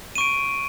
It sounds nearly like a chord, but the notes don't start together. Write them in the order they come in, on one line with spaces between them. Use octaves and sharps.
D#7 C#6 D7